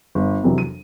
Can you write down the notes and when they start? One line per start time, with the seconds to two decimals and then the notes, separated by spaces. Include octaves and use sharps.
0.15 G1
0.44 F2 C3 E3 F#3
0.58 D#7